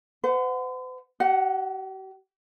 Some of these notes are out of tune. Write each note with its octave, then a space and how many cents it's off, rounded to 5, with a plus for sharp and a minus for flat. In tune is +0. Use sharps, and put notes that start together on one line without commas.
C5 -45 F#5 +0
G4 -45 F#5 +0